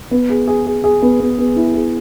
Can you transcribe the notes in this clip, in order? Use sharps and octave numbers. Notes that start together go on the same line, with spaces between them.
B3
G#4
G#4
G#4
G#4
B3
B3
B3
E4
G#4